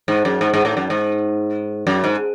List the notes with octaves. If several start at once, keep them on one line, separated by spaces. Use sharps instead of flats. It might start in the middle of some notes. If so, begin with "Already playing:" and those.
G#2
F#2
G#2
G#2
A2
F#2
G#2
F#2
G#2